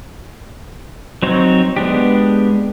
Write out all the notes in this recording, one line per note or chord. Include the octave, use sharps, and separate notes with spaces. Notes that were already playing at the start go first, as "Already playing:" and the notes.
F#3 C4 D#4 C5 C#5
G#3 B3 D4 G4